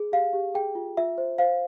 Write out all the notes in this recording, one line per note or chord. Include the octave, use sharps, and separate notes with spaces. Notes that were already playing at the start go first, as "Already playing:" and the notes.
Already playing: G#4
G4 F5
G4
G#4 G5
F4
F4 E5
C5
C5 F5